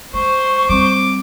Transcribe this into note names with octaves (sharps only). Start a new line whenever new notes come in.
G#3 C5 C#6
G3 C4 D6